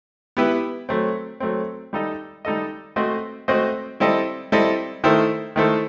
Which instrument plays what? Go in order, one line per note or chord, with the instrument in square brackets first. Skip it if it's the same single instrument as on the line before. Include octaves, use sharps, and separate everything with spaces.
[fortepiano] B3 E4 G4 B4
F#3 A3 C4
F#3 A3 C4
G3 D#4 A4 D#5
G3 D#4 A4 D#5
A3 C4 F#4 C5 D#5
A3 C4 F#4 C5 D#5
G3 C4 E4 A4 D#5
G3 C4 E4 A4 D#5
D#3 A3 E4 A4 C5
D#3 A3 E4 A4 C5